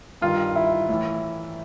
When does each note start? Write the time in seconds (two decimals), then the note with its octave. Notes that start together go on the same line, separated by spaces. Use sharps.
0.21 G2 D#3 F4
0.56 E4
0.89 A2 E3